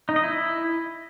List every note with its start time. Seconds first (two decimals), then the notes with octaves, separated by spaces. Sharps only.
0.09 D#4
0.16 D#5
0.23 E4